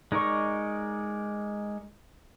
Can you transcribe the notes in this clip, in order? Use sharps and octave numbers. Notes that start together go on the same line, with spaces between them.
G#3 D#4 A#4 D5 C#6